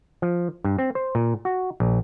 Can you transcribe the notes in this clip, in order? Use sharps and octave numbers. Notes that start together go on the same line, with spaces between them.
F3
G2
C4
C5
A#2
F#4
A#1